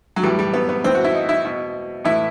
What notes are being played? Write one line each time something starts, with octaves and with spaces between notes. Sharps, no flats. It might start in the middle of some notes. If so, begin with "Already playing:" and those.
F#3
A2 E3 G3
G3
B3
B3
A2 E3 C4
F#4
E4
D#4
E4
B2
A2 E3 E4